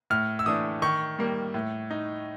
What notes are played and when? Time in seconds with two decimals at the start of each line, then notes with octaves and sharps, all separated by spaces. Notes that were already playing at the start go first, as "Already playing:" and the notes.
0.10 A2 F6
0.39 E6
0.46 E3 A3 D4 D#6
0.82 D#3 C#6
1.19 G3 A#3
1.54 A2
1.91 D#4